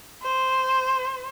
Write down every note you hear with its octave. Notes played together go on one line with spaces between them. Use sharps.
C5